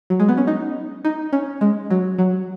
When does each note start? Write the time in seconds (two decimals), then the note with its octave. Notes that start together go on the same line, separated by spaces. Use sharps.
0.10 F#3
0.20 G#3
0.29 B3
0.37 C#4
0.47 D#4
1.05 D#4
1.33 C#4
1.61 G#3
1.90 F#3
2.18 F#3